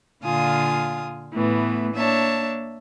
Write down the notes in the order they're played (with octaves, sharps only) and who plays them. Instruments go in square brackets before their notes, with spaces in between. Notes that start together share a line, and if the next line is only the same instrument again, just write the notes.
[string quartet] A#2 D3 F4 F5 G#5 D#6
A2 E3 A3 B3
A#3 D4 C#5 E5 A5